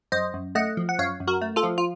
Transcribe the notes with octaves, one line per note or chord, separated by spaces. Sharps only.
F#2 C5 D#5
F#2
A3 D#5 F#5
F3
F#5
F#2 C#5 F5
F#2
F#4 A#4
A3
F4 A4
F3
F4